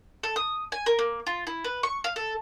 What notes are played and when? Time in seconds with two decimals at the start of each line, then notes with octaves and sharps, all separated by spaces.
0.23 A4
0.36 D#6
0.72 G#5
0.86 A#4
0.99 A#3
1.27 F4
1.47 E4
1.64 B4
1.83 C#6
2.04 F5
2.16 A4